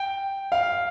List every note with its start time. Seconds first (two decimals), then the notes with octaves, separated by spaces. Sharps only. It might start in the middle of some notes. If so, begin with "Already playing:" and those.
Already playing: G5
0.52 F5